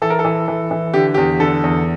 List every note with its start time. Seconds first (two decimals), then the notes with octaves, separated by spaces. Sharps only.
0.02 E3 A4
0.10 A#4
0.19 A4
0.25 E3
0.48 E3
0.71 E3
0.94 D3 G4
1.14 E2 G4
1.40 D3 A4
1.64 E2